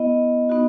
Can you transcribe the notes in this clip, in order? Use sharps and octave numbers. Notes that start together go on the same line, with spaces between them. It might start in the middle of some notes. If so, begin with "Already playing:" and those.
Already playing: B3 E4 D#5
B3 D#4 F#4